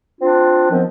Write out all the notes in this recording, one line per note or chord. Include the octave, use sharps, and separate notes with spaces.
C4 D4 F4
D#3 F3 B3 C4